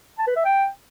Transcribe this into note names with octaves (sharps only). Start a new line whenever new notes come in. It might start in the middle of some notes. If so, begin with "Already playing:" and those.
A5
B4
E5
G5